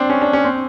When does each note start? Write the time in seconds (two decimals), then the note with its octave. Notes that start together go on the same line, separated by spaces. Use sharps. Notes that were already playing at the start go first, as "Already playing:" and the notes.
Already playing: C4 D4
0.10 C#4
0.22 D4
0.33 C#4
0.44 C4